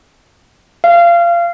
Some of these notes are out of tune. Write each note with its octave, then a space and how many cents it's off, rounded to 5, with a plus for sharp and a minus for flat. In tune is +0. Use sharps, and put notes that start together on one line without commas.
F5 -25